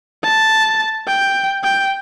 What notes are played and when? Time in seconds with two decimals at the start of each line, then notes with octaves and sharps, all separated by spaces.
0.24 A5
1.07 G5
1.64 G5